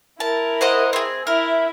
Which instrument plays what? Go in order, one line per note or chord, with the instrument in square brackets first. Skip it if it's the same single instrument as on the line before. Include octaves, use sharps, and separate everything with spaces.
[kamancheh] E4 A#4 [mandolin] A5
[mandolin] C5 D#5 F#5
C4 G#4
[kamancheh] E4 E5 [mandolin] A#4